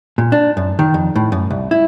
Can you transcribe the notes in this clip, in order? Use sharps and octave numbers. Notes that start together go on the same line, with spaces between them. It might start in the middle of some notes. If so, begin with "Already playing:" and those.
A#2
D4
F#2
D#3
F2
A2
F#2
C2
E4